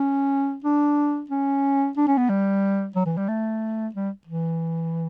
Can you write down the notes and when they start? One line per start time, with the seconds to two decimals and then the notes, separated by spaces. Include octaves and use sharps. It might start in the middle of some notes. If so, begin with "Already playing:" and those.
Already playing: C#4
0.64 D4
1.30 C#4
1.97 D4
2.07 C#4
2.18 B3
2.29 G3
2.95 F#3
3.06 E3
3.17 G3
3.28 A3
3.95 G3
4.27 E3